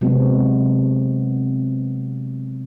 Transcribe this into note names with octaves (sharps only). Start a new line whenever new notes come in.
C3 F#3 G#3 B3 C4 F#4